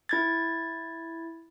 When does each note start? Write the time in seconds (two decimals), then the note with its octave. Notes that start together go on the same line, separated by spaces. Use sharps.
0.09 E4 G#6 A6